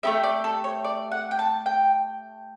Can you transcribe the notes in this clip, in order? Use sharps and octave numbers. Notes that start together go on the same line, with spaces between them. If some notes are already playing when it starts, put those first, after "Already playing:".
A3 E4 G4 E5
D5
A4
C#5
D5
F#5
G5
A5
G5